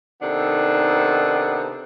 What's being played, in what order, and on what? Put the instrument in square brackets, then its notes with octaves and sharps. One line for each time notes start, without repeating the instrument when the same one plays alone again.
[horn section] C3 D#3 B3 D4 D#4 A4